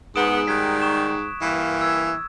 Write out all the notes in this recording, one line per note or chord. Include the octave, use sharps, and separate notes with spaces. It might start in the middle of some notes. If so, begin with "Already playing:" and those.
E2 G#2 B3 D#6 D7 E7
D#3 G3 F#6 G#6 B6
C#6 E7
G2 E3 A#3
E6 G#6